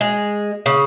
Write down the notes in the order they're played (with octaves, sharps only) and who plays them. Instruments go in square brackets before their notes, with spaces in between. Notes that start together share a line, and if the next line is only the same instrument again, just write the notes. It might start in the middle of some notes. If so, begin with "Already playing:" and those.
[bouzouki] G#3
C#3